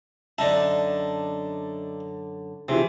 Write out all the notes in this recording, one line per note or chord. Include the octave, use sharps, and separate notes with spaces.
F#2 D3 D4 D#4 E5 A5
C3 E3 F3 G#4 E5